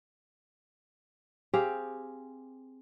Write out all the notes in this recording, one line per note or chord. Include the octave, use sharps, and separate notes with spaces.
C4 G4 G#4 F5